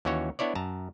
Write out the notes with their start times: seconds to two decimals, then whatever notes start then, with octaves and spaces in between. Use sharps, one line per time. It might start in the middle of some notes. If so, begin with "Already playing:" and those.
0.05 D#2 E3 C#4 F#4 C#5
0.39 B3 D4 E4 C#5 D5
0.55 F#2 A5 A#5